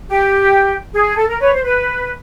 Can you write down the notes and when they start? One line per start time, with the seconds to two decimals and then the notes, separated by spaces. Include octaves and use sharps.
0.08 G4
0.93 G#4
1.16 A4
1.27 A#4
1.39 B4 C#5
1.52 C5
1.62 B4